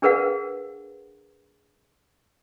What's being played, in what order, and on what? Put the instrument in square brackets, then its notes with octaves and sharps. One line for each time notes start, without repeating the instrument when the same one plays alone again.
[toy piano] D4 G#4 A#4 B4 F5 F#5